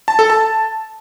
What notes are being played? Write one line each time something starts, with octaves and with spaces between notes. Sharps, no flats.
A5
A4
A5